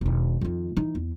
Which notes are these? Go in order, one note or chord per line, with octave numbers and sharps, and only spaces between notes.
E1 D#3
F2 D#3
E3 D#4
E2